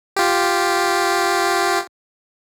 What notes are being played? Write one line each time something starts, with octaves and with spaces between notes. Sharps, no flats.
F4 G4